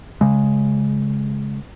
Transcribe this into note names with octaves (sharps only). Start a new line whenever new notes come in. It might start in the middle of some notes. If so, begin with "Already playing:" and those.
C#3 G#3